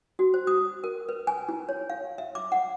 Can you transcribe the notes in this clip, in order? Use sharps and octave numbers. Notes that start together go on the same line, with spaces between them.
F#4
C5
D#6
A#4
B4
G#5
E4
C#5
F5
E5
D6
F#5